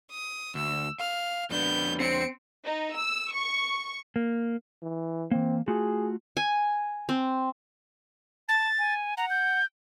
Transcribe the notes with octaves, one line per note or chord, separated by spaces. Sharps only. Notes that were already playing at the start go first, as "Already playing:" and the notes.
D#6
D2 E6
F5 F6
F2 B3 D4 G6
C4 C#7 D7
D#4
E6
C#6
A#3
E3
E3 A#3 C4
A3 F4 F#4 G#4
G#5
C4
A5 A6
G#5
F#5 A#5
G6